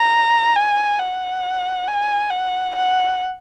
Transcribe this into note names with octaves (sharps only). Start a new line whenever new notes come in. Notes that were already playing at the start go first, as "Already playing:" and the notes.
Already playing: A#5
G#5
F#5
G#5
F#5
F#5